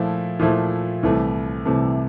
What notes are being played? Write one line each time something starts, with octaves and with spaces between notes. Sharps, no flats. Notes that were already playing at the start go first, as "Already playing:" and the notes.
Already playing: A#2 F3 A3 E4
A#2 F3 A3 E4
C2 C3 E3 A3
C2 C3 E3 A3